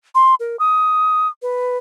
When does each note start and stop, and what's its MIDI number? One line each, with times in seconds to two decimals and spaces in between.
0.15 0.35 84
0.40 0.56 70
0.59 1.28 87
1.42 1.77 71